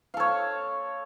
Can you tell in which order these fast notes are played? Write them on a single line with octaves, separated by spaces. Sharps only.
F5 A4 C#5